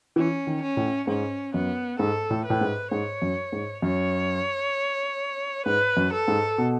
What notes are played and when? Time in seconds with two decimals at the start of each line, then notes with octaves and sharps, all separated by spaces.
0.16 E3 C#4
0.47 D#3
0.62 C#4
0.77 A2
1.07 G#2 C#4
1.54 F#2 B3
1.99 G#2 A4
2.30 A2
2.45 A2 B4
2.61 G#2
2.91 G#2 C#5
3.22 F#2
3.52 G#2
3.82 F#2 C#5
5.66 G#2 B4
5.97 F#2
6.13 A4
6.28 G#2
6.58 B2